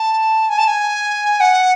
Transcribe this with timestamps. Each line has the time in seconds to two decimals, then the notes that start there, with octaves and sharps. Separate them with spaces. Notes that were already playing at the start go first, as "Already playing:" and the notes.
Already playing: A5
0.49 G#5
0.58 A5
0.67 G#5
1.40 F#5